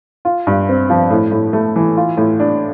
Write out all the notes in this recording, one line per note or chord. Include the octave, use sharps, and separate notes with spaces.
F4
G2
C4
F3
A2
A2
A3
E3
F4
A2
D4